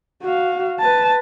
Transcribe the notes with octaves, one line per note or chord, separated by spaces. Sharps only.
F#4 F5
B4 A5